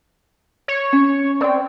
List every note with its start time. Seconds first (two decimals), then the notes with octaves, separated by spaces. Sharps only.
0.68 C#5
0.93 C#4
1.41 C4 D5 G5